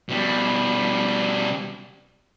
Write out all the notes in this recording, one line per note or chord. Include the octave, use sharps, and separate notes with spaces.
B2 G3